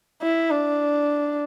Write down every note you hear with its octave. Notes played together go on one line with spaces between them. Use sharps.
E4
D4